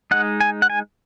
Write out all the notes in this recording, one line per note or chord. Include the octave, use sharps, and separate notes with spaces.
G#3 D#4 F#5
G#5
F#5
G#5